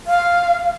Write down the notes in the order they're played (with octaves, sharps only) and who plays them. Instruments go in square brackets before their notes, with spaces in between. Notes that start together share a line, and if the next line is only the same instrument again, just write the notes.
[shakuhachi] F5